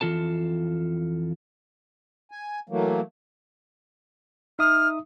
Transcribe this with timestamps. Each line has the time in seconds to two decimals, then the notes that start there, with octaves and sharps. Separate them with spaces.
0.01 F2 E3 F4 A4 A5
2.31 G#5
2.69 E3 F#3 A3 A#3
4.59 D#4 E5 D#6 F6